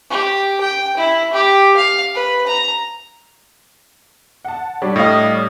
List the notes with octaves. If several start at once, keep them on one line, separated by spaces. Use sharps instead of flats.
G4
G5
E4
G4
F5
B4
A#5
F#5 A5
G3 D4 C#5
A2 D#5 F5